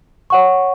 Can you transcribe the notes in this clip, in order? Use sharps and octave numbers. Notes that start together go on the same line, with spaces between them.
C#5 F#5 C#6